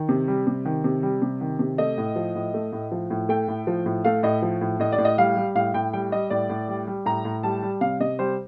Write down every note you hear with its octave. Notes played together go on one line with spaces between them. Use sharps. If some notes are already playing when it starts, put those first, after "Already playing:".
Already playing: D#3
C3
G3
C3
D#3
C3
G3
C3
D#3
C3
A3 D#5
A2
F3
A2
A3
A2
F3
A2
A3 G5
A2
F3
A2
A3 F5
A2 D#5
F3
A2
A2 D#5
D5
A2
D#5
G3 F5
G3
A2 F5
A2 G5
G3 G5
G3 D#5
A2 D5
A2
G3
G3
A2 A#5
A2
G3 A5
G3
C3 F5
C3 D#5
G3 C5